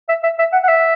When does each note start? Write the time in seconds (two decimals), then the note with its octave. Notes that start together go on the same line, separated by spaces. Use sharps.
0.09 E5
0.23 E5
0.39 E5
0.53 F#5
0.63 F#5
0.68 E5